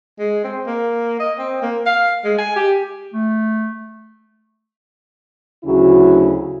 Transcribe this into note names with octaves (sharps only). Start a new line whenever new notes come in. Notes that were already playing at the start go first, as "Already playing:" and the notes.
G#3
C4
A#3
D#5
C4
A#3
F5
G#3
G#5
G4
A3
D2 C#3 F#3 E4 F#4